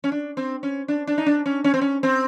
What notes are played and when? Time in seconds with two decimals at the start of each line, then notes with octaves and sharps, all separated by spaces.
0.04 C#4
0.12 D4
0.37 C4
0.63 C#4
0.88 D4
1.07 D4
1.18 D#4
1.26 D4
1.46 C#4
1.64 C#4
1.74 C4
1.81 C#4
2.03 C4